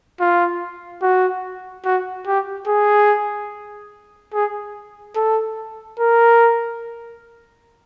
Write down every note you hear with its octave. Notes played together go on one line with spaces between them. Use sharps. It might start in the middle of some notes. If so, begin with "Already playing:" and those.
F4
F#4
F#4
G4
G#4
G#4
A4
A#4